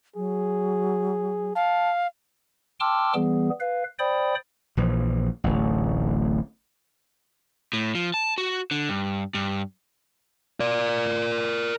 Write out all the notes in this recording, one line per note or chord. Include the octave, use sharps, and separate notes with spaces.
F#3 G#4
F5 A5
G5 A5 C6 D6 E6 F6
E3 G3 B3 G#4
B4 F5
C5 D5 G5 B5 D#6
A#1 E3 F3
D1 A1
A2
F3
A5
F#4
D3
G2
G2
A#4 D5